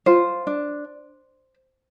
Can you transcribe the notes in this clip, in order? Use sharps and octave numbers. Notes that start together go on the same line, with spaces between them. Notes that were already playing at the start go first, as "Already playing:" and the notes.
F4 C5
D4